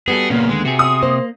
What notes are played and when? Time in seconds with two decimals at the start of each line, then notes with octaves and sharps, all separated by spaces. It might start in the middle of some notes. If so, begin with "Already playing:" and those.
0.08 G3 B3 F#4 G#4 A4
0.30 A#2 C#3 A#3 C#4
0.49 D#2 D3 G#3
0.65 C3 F#4 G#4
0.79 D#6
1.03 A#3 C5